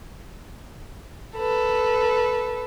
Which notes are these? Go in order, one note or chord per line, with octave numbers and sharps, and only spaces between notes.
A4 B4